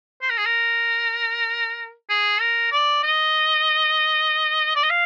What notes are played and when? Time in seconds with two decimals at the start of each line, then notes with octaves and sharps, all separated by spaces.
0.22 C5
0.30 A#4
0.38 G#4
0.45 A#4
2.09 G#4
2.41 A#4
2.72 D5
3.03 D#5
4.76 D5
4.83 D#5
4.90 F5